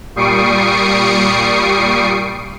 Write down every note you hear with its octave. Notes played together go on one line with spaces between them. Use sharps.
A#2 G3 C#6 D#6 C7 D7